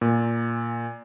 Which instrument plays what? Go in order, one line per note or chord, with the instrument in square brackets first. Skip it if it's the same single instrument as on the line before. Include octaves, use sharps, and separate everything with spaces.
[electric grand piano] A#2